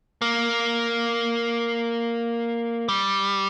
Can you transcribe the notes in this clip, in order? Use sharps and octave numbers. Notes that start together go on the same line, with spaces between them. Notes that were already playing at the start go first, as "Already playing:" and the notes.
A#3
G3